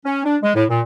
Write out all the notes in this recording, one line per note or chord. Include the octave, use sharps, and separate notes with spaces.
C#4
D4
G#3
A2
A#2